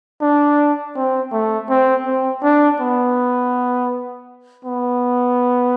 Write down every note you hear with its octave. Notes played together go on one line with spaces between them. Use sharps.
D4
C4
A3
C4
C4
D4
B3
B3